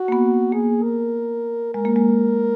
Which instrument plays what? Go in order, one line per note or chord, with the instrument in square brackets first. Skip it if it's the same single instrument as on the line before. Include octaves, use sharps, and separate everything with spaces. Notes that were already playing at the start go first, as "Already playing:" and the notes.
Already playing: [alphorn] F#4
[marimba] A#3
B3
[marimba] A#3 [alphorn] G#4
[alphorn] A#4
[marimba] G#3 [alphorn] A#4
[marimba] A#3
G#3